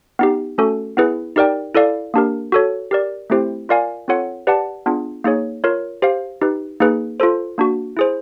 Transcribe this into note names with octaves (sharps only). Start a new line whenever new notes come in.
B3 D#4 G4
A3 C#4 F#4 A4
B3 E4 G#4 B4
D#4 G4 A#4 D5 G5
E4 A4 D5 F5
A#3 D4 G4 A#4
F#4 A4 C#5
G4 A#4 D5
A3 C4 E4 G4 C5
F4 A#4 D5 F5 G#5
C4 F4 A4 C#5 F#5
G4 B4 D5 F#5 A5
B3 D4 F4 G#4
A#3 D#4 G#4 C#5
F4 A#4 C#5
G4 C5 F5
D#4 G4 B4
A#3 D#4 G#4 B4
F4 A4 C5
A#3 D4 F#4
E4 G#4 C5